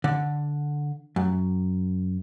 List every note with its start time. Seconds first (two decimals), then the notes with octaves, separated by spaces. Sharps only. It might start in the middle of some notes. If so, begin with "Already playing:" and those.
0.04 D3
1.16 F#2